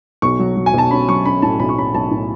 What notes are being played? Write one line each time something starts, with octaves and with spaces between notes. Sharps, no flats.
B1 C#6
F#3
F#3
G#5
B1 A5
C#4 B5
F#3 C#6
C#4 B5
A2 A5
B1 B5
C#6
C#4 B5
B1 A5
A2